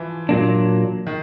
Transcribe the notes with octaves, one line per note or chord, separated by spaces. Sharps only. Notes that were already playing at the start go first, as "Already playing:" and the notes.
Already playing: E3 F3
A#2 F#3 A#3 D4
D#3